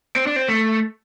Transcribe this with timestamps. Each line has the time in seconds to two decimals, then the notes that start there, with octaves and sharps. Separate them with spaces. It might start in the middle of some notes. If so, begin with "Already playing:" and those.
0.16 C4
0.27 D4
0.36 C4
0.49 A3